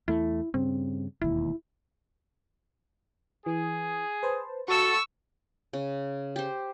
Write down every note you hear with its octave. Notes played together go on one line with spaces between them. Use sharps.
E2 A3 E4
G2 C#3 C4
E1 D#2 E4
E3 G#4
B4 C5 A5
F#4 A4 F5 C#6 E6
C#3
G4 C5